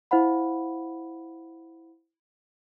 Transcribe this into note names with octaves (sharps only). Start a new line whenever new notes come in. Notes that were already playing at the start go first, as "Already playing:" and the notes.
E4 C5 F5 F#5 B5